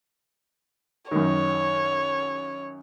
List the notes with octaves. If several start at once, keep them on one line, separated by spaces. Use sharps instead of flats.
F#2 D#3 C#5